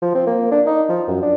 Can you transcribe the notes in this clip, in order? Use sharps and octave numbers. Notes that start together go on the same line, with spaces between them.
F3
C4
A#3
D4
D#4
F3
F#2
D4